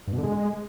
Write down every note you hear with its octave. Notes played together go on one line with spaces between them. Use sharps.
G2
B2
D3
G#3